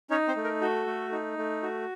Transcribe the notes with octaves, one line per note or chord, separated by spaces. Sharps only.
C#4 D#4 C#5
C4 C5
A3
A#4
F#4 A4
A3
D#4
A3
F#4